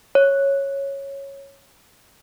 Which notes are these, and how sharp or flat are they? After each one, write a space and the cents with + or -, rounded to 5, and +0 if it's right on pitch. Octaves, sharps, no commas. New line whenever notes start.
C#5 -5